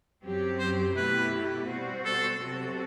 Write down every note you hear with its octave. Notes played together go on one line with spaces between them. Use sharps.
F#2 F#3 C4 G4
C5
B2 A3 E4 G4 B4
B2 G3 C4 F#4 C5
A4
C3 F#3 C4 F#4 A4